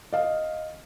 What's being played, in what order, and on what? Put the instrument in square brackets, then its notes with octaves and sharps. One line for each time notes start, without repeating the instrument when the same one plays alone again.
[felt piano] D#5 F5